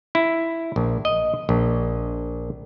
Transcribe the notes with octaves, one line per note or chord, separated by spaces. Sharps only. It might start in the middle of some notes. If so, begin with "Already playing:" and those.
E4
A#1
D#5
A#1